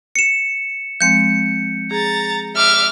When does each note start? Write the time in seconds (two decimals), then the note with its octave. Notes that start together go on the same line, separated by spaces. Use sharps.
0.16 C#7 E7
1.01 F3 G#3 C4 G6 C#7
1.91 G#4 A#5 A6
2.56 E5 D6 F6